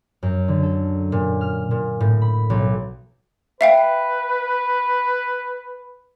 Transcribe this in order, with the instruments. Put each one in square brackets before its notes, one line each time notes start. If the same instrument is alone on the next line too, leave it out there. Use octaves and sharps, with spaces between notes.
[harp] F#2
D3
A4
A#2
F6
A#2
A2
B5
B1
[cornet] B4 [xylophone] E5 F5 G5